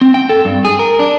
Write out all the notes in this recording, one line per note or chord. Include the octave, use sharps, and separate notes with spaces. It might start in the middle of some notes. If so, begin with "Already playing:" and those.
C4
G5
A4
G2
G#4
A#4
D4